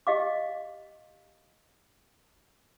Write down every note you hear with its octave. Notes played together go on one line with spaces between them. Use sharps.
G4 D#5 F5 D6